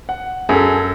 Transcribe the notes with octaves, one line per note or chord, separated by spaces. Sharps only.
F#5
F#2 G#4 A4